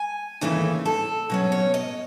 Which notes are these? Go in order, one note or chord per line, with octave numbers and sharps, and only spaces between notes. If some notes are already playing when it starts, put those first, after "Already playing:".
Already playing: G#5
D#2 C#3 E3 A3
A4
B2 F#3 C#4
C#5
D#5